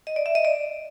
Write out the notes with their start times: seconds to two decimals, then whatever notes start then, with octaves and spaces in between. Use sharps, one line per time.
0.07 D#5
0.16 D5
0.26 E5
0.35 D#5
0.45 D5